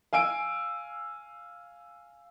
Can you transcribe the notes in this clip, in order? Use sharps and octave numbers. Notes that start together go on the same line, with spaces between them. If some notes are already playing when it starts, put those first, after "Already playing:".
F5 G#5 E6 D7